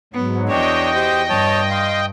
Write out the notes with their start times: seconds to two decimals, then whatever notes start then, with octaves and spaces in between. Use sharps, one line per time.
0.14 G#2 F#3 B3
0.49 E2 D4 F#4 C#5 D#5 G5
0.95 G4 C5
1.29 G2 C#5 A5
1.71 F5 C6